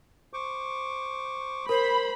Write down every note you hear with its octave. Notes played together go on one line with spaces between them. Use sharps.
C5 C#6 D6
A#4 C5 B5